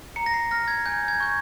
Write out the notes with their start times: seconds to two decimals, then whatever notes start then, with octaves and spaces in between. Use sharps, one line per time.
0.16 A#5 C#7
0.26 A#6
0.34 C7
0.51 F6 A#6
0.68 G#6
0.86 G#5 G6
1.08 G#6
1.20 C#6 G6